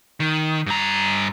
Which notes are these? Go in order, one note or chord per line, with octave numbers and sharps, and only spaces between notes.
D#3
G2 A#5